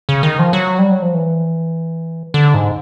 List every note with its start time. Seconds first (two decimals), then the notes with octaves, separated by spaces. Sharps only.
0.09 C#3
0.23 D#3
0.39 F3
0.53 F#3
0.79 G3
0.91 F#3
1.02 F3
1.14 E3
2.34 D3
2.54 G#2